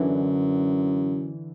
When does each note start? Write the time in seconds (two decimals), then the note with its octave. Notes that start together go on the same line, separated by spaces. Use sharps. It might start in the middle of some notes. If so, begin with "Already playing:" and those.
Already playing: F#2 D3 E3